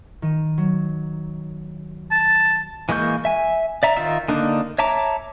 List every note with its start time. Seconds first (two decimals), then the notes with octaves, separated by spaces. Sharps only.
0.22 D#3 D#7
0.58 F#3
2.11 A5
2.89 E3 G#3 A#3 C#6 G6
3.25 E5 G#5
3.83 D5 E5 A#5
3.97 D#3 D#4 F4 E5
4.28 D3 A#3 D4 D#4
4.78 C#5 E5 A5 A#5 D6